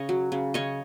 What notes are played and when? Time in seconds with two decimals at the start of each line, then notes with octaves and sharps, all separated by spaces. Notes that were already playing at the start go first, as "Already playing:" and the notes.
Already playing: C#3 C#5 D#5
0.09 F#3
0.32 C#3
0.54 C#3 C#5 D#5